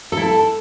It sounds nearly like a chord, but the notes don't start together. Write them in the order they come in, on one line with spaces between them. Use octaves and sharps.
A4 E4 A5